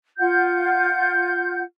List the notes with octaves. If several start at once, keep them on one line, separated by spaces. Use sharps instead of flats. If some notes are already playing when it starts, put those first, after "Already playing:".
F4 F#5 G6